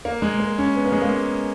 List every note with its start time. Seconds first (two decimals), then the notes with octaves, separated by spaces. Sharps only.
0.05 A#3
0.22 G#3
0.40 A#3
0.58 C#4
0.76 B3
0.85 A#3
0.92 G#3
1.02 A#3